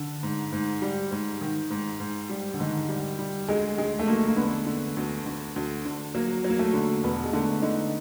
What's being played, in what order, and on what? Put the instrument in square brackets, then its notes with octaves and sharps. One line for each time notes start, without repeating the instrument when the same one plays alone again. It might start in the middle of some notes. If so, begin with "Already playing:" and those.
Already playing: [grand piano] D3
[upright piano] G#2
G#2
G3
G#2
D#3
G#2
G#2
G3
[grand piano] D3
[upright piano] G#2 [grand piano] D#3
[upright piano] G3
G3
[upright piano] D2 [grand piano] G#3
[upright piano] D2 [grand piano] G#3
[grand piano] A3
[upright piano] D2 [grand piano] A#3
[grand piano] A#3
[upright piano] D3 [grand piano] B3
[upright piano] D3
D2
D2
D2
D3
[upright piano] F#3 [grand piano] A#3
[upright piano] F#3
[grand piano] A#3
A3
[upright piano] D3
[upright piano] E1 [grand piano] B3
[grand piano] G#3
[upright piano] D3 [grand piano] A3
[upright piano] D3 [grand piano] D#4